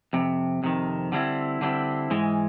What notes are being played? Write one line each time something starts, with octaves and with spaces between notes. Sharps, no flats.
F2 C3
F2 C3 D#3
D3 G3 C4 E4
D3 G3 C4 E4
G#2 E3 G#3